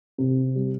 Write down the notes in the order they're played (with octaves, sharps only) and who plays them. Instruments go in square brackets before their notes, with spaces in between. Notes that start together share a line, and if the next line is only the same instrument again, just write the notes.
[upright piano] C3
G3